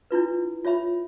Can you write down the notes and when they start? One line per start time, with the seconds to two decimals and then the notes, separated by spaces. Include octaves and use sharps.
0.11 D4 E4 F4 B4
0.65 F4 C#5 E5 B5